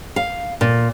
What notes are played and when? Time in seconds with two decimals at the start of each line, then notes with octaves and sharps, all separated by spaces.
0.16 F5
0.61 A#2